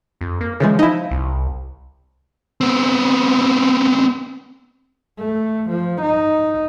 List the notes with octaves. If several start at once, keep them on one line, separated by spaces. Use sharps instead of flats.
F2
A#3
C#3 E3 F3 G#3
D#4 E4
C2
B3 C4
A3
F3
D#4